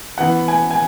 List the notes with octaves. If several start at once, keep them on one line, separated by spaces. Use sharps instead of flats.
E3 B3 F#5
G#5
G#5